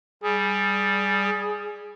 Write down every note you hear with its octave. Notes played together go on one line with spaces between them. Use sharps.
G3 G#4